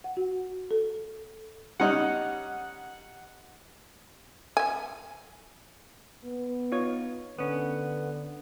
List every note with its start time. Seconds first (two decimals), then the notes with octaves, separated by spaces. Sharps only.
0.04 F#5
0.17 F#4
0.71 A4
1.80 G3 C#4 D#4 F#5
4.57 E5 G#5
6.24 B3
6.72 D#4 F4 C#5
7.39 D3 B3 C#4